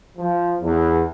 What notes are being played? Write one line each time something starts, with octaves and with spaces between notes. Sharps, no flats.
F3
E2